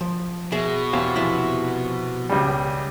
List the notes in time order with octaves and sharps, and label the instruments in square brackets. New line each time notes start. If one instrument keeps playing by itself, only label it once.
[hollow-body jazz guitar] F3
[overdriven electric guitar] B2 [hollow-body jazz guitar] G#4 E5
[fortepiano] E2 [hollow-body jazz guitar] G4 C5 F5
[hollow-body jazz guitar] C3 F3 E4
[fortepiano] C#2 G3